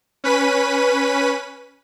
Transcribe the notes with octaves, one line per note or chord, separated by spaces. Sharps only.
C#4 B4 B6 D#7